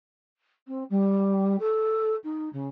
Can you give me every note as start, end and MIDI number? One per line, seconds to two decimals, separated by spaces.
0.68 0.84 60
0.90 1.56 55
1.60 2.15 69
2.24 2.49 63
2.53 2.69 49